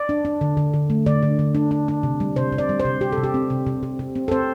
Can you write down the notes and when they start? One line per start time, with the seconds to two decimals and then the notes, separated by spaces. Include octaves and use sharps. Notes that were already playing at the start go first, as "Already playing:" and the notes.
Already playing: D5
0.09 D4
0.25 D4
0.41 D3
0.57 D3
0.74 D3
0.90 A3
1.06 D3 D5
1.22 D3
1.39 D3
1.55 D4
1.71 D4
1.88 D4
2.03 C3
2.20 G3
2.36 C3 C5
2.52 C3
2.58 D5
2.69 G3
2.79 C5
2.85 C3
3.01 C3 G4
3.12 A4
3.18 C3
3.24 G4
3.34 C4
3.50 C3
3.67 C3
3.83 C3
3.99 C3
4.16 C4
4.28 A4
4.31 C4 C5